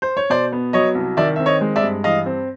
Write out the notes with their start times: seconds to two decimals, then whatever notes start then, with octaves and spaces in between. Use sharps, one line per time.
0.02 C5
0.17 C#5
0.30 B2 C5 D5
0.52 B3
0.73 F#3 C#5 D#5
0.95 C2
1.17 D#3 D5 E5
1.36 C4 E5
1.46 C#5 D#5
1.61 G#3
1.76 D5 E5
1.83 G2
2.04 E3 D#5 F5
2.26 C4